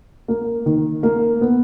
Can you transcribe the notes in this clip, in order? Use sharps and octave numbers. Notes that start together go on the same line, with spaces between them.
A#3
D#3
A#3
B3